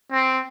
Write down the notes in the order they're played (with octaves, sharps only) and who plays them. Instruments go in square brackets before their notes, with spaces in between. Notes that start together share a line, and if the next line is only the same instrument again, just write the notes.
[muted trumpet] C4